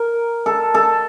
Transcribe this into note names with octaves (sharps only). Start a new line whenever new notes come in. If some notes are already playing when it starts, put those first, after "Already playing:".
Already playing: A#4
A4
A4